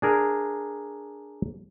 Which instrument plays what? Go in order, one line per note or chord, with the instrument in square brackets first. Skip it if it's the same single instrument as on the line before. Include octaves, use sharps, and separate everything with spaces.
[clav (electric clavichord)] D4 G#4 A#4